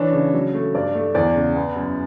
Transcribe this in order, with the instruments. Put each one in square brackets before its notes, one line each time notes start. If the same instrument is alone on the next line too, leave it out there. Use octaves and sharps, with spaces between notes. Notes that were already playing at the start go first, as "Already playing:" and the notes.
Already playing: [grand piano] E3 D4 [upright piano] C#5
[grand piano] C#3
F#3
A3
[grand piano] G2 [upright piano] D5
[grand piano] A3
[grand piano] E2 [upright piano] D5
[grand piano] C#3
B3
F#2